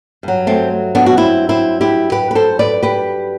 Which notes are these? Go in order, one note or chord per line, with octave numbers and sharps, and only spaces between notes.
G2 F#3
A3 C4
B3 D4
F#4
C4 E4
C4 E4
E4 G4
G4 B4
B4
A4 C5
B4 D5
G4 B4